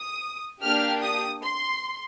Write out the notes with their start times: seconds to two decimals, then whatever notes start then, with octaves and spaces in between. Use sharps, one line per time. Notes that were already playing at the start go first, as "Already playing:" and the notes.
Already playing: D#6
0.62 A#3 D4 G4 F6
1.03 D#6
1.43 C6